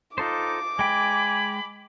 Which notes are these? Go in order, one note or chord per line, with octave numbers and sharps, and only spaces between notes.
D#4 F4 A4 C5 D6
G#3 G5 G#5 B5